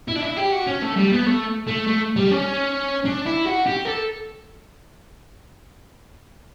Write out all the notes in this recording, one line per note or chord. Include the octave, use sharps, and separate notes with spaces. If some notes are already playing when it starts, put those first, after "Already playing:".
E4
D4
E4
G4
F#4
C#4
A3
G3
B3
A3
A3
A3
G3
C#4
D4
E4
F#4
G4
A4